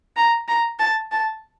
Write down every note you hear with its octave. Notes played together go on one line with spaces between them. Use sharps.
A#5
A#5
A5
A5